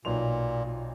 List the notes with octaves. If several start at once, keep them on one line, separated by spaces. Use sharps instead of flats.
B1 A#2 C6 F7